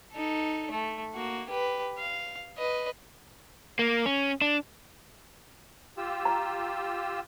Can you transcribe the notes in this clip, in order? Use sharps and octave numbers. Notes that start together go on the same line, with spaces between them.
D#4 A4
A3
A#3 F#4
G4 B4
F5
B4 D#5
A#3
C#4
D4
F4 G4 E6
A#5